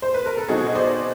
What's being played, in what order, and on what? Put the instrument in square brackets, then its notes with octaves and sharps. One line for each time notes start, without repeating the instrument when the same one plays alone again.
[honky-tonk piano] C5
B4
A#4
A4
B2 F#3 A3 C4 D#4 F#4 G#4
D#5
C5 D5